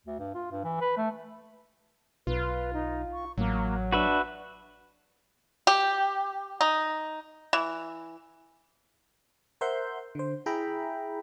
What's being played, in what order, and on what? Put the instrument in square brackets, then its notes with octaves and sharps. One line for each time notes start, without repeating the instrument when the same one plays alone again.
[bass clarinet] D2
G2
F4
G2
E3
B4
A3
[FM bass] B1 [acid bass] F4 [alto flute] B4
[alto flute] D#4
C#6
[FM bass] A1 [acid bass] F#3 [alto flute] A#3
[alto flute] D4 [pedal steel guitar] F#4 B4 E5
[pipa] G4
D#4
E3
[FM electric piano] A#4 C5 E5 F#5 C6 G6
D3 C5
E4 G#4 E5 G5 A#5 B5